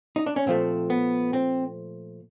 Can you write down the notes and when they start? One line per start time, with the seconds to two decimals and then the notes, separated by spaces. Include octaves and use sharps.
0.16 D#4
0.26 D4
0.36 C#4
0.46 A#2 F3 A3 C4
0.90 B3
1.33 C4